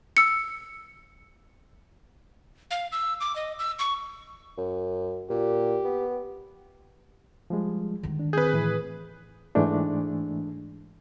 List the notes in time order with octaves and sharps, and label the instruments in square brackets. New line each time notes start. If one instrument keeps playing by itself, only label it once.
[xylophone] E6 C#7
[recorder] F5
E6
D6
D#5
E6
C#6
[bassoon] F#2
[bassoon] A#2 [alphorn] G4
[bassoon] B3
[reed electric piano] F3 G3 G#3
[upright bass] D3 D#3
[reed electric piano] D4
[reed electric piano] C4 G6 [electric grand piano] G#4 B4
[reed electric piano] A2 E3
G#2 E3 G#3 A3 D4